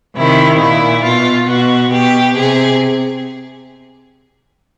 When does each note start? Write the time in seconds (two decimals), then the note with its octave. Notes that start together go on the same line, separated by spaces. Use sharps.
0.17 C3 D#3 E4
0.59 A#2 E4
1.03 B2 F4
1.47 B2 F#4
1.91 B2 G4
2.35 C3 G#4